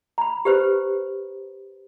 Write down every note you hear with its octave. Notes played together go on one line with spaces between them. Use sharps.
A#5 B5
G4 B4 C5